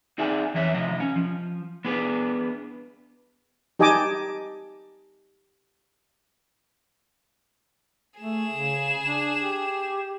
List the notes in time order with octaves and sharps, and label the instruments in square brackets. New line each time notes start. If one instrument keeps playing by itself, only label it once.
[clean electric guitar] C4 D#4 G#4 D5 E5 G#5
F2 E3 C#5 E5
C3 F3 D#5
C#4
F3
B3 D4 G#4 B4
[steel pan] D#4 G4 D#5 G#5 A5 D6
[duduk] A3 [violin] G#4 E7
[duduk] C#3
D4
G4